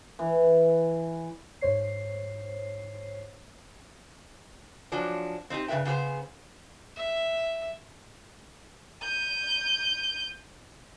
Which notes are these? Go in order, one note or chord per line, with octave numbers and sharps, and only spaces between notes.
E3
G#2 C5 C#5 C7
F3 F#3 C#4 D4
C4 D#4 F4 G4
G2 C#3 C#4 B4 E5 G5
C#3 B3 G4 G#4 C5
E5
G6 D#7